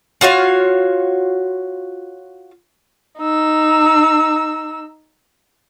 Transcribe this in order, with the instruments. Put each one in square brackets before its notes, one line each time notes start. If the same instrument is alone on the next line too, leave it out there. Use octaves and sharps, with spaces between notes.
[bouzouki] F4 F#4 C#5 F5
[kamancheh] D#4 E6